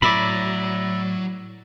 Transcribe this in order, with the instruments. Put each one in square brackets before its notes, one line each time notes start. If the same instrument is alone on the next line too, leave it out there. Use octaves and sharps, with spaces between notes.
[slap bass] A2 [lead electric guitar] F#3 [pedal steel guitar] D5 E5 B5